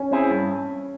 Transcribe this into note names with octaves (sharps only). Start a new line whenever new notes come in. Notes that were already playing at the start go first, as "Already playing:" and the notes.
Already playing: C#4
C4 E4 G#4
G2